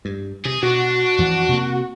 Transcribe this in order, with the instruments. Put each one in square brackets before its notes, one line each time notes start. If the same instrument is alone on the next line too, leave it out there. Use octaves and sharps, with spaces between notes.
[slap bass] G2
[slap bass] C3 [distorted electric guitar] G#4
[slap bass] B2 [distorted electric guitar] D4 [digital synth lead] F#4
[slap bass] F2 E3 F3
C3 A#3